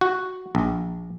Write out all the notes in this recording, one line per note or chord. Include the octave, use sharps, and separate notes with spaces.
F#4
A#1